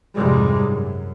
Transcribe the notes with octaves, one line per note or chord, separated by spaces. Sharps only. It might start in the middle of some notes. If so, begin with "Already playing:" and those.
C2 F2 G#2 C3 G3 G#3
F#2